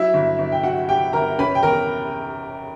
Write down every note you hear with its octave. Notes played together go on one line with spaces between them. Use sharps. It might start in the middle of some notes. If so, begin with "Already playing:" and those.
Already playing: F#3 E4 E5
G1
G1
G5
F#3 F#4 F#5
F#3 G4 G5
G1 A#4 A#5
C#4 B4 B5
G5
E2 A#4 A#5